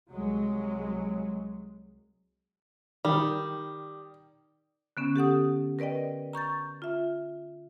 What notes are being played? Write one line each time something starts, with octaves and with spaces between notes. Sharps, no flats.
C2 F#3 G#3
D#3 G3
D3 B3 C#4
G4 A4 F#5 D#6
A#4 B4 D5 D#5 G5
A#5 C#6 G6 A6
F4 E5